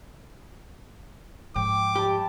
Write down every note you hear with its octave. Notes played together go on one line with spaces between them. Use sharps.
G#2 F3 G5 D6
G3 G4 A5